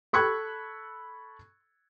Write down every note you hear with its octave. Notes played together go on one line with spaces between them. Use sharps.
A4 B5 C#6 E6 F#6 G#6